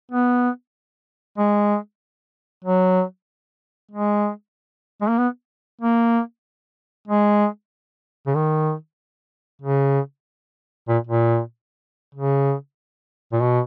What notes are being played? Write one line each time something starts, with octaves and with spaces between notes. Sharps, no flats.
B3
G#3
F#3
G#3
G#3
A#3
B3
A#3
G#3
C#3
D#3
C#3
A#2
A#2
C#3
A#2
B2